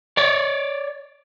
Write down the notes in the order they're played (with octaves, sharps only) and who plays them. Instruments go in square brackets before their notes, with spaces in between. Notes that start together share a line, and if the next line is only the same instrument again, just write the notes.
[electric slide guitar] C#5 D5